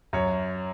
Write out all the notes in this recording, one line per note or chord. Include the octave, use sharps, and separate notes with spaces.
F#2 C#5